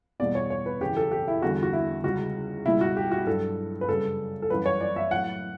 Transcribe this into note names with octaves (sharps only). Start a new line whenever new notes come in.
E2 B2 G3 D5
C#5
C#5
B4
F#2 C#3 E3 G4
A4
G4
E4
E2 D3 G3 F#4
F#4
E4
C#2 C#3 G3 F#4
C#2 B2 G3 E4
F#4
G4
F#4
G2 F#3 A4
B4
F#2 C#3 G3 A4
A4
F#2 E3 G3 B4
C#5
D5
E5
A2 F#3 F#5